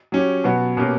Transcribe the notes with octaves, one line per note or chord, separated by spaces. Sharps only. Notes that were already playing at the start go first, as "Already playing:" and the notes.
F#3 C#4 G4
B2 F#3 B3 F#4
B2 A#3 C#4 G4